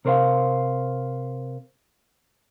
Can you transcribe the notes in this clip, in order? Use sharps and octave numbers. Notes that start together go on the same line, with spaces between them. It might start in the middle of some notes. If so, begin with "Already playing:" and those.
C3 A#4 C5 D5 F5